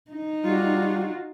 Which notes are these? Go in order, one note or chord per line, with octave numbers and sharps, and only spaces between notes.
D#4
G3 F4 F#4